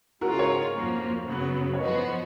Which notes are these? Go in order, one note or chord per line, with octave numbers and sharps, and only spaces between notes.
C#3 G#3 C#4 F4 F#4 A#4
A#4 C#5
F2 F3 A#3
F#2 C#3 F#3 B3
C#5
F3 B3 F#4 B4 D#5